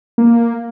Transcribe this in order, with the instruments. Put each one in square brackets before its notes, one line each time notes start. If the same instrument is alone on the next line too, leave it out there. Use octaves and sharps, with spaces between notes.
[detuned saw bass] A#3